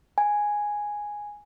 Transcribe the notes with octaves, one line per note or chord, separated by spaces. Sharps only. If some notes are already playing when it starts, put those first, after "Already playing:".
G#5